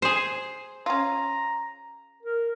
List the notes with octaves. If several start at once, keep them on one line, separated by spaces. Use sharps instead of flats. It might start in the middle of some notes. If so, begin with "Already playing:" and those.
G#4 C5
C#4 F4 A#5
A#4